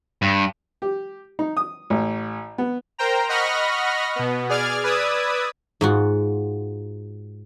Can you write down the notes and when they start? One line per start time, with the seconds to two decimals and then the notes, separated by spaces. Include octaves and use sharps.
0.22 G2
0.82 G4
1.39 D#4
1.57 D#6
1.90 A1
2.58 B3
2.98 A#4 C5 G5 A#5
3.29 D#5 F#5 B5 C#6 F6 A#6
4.16 B2 B3
4.49 G#4 D5 F6 G#6
4.84 B4 D5 D#6 E6 G#6
5.81 G#2 F4 F#4